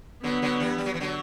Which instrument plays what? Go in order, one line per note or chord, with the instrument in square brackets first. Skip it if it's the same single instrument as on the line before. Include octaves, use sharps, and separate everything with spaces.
[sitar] D3 F#3 [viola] B3
[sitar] D3 F#3
E3 G3
G3
F#3
E3
D3 F#3